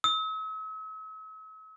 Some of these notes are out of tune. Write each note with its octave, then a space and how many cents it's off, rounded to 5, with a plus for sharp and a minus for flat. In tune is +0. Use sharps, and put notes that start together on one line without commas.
E6 -45